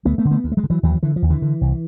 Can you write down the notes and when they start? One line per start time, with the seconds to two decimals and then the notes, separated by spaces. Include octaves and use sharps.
0.05 D2 A3 B3
0.18 A3 B3
0.25 D3
0.31 A3 B3
0.44 D2
0.52 A3
0.57 F#3 G#3
0.64 D3
0.70 E3 F#3
0.83 D#2 E3 F#3
1.03 D3 E3
1.16 F3
1.22 D#2
1.30 D3 E3
1.42 D3
1.61 C2